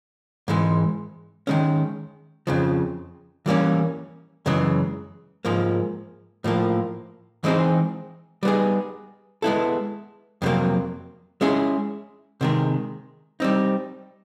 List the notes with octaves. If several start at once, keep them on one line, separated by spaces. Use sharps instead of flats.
G#2 E3 G#3
D#3 G#3 C#4
F2 C#3 F3
E3 G3 A#3 C#4
F#2 C#3 E3 G#3
G#2 F3 A#3
A2 F3 A#3
E3 G#3 C4 D#4 G#4
G3 B3 D#4 G#4
G#3 B3 E4 A4
F2 C3 D#3 F#3 A#3
G#3 C#4 E4 G#4
C3 D#3 G#3
G3 C4 D#4